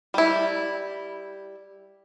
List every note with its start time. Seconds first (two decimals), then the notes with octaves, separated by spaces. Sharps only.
0.14 G3 E4